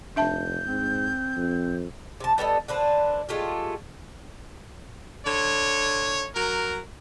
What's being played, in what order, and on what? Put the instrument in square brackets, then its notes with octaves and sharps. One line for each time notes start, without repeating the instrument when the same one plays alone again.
[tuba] F1 [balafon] D4 E5 A5 [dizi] G6
[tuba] G#2 [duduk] C4
[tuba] F2
[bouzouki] C3 A5
G3 B3 A4 D#5
D3 D4 B4 C5
G#3 A3 F4 G4
[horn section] D3 C#5
F#3 A#4